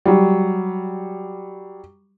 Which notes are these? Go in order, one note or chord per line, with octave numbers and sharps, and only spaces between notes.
F#3 G3